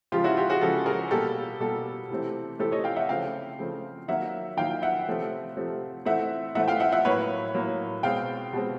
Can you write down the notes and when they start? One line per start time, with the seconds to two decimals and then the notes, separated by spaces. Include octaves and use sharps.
0.12 C#3 F3 G#3 F4 G4
0.24 E4 F#4
0.37 F4 G4
0.50 F#4 G#4
0.61 C#3 F3 G#3 G4 A4
0.86 G#4 A#4
1.11 B2 G3 A#3 G4 A4
1.60 B2 G3 A#3 G4 A4
2.10 C3 E3 A3 C4
2.59 C3 E3 A3 C4 G4 A4
2.72 C#5 D#5
2.84 F5 G5
2.96 E5 F#5
3.09 C#3 F3 A3 C4 F5 G5
3.58 C#3 F3 A3 C4
4.08 D#3 F#3 A#3 E5 F#5
4.57 D#3 F#3 A#3 F5 G5
4.82 E5 F#5
5.07 C3 F3 A3 C4
5.57 C3 F3 A3 C4
6.05 E3 A3 C4 E5 F#5
6.55 E3 A3 C4 E5 F#5
6.68 F5 G5
6.80 E5 F#5
6.92 E5 F#5
7.05 A2 F#3 A#3 B4 C#5
7.55 A2 F#3 A#3
8.03 B2 G#3 C4 F5 G5
8.53 B2 G#3 C4